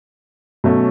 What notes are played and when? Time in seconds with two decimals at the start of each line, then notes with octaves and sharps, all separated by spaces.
0.64 B2 F#3 A3 C#4